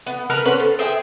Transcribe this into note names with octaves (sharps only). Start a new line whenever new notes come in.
B3
A#4 B4 A5 A#5
B3 C#4 B4 C5
A4
G#4 C5 E5 G5